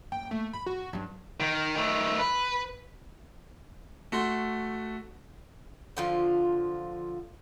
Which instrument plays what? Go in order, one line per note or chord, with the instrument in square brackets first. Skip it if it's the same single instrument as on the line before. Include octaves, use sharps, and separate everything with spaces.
[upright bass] F#1 [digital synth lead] G5
[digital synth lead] A3 [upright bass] A#3
[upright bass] F#2 [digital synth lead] B5
[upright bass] F#2 [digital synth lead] F#4
[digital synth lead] G2 [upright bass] F#3 C#4
[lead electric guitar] D#3
D#3 A3
B4
[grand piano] A3 F#4 C6 G7
[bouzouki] D3 F3 F4